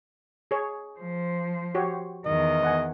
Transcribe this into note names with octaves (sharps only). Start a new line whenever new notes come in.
G#4 C#5
F3 C5
F#4 G4 C#5
E2 D#3 D#5
B3 F#5 G#5